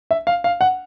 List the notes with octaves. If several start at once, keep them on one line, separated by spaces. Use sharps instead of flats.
E5
F5
F5
F#5